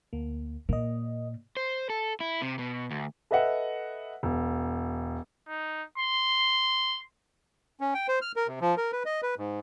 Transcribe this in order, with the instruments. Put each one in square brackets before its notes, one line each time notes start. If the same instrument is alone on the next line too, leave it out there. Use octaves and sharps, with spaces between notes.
[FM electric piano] D2 A#3
[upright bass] A#2 [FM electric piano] A#3 D#5
[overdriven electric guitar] C5
A4
E4
C3
B2
D2
[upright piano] A4 B4 D#5 E5 F#5
E1
[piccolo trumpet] D#4
C6
[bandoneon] C#4
G5
C5
F6
A#4
C3
F3
A#4
B4
D#5
B4
G#2